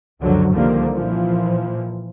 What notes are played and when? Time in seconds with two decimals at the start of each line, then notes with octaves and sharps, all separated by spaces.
0.20 C#2 F#2 D3 F3 F#3
0.52 C2 D3 D#3 F3 G3 A#3
0.94 A#2 E3 F3